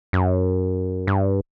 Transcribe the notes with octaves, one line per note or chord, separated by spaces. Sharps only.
F#2
G2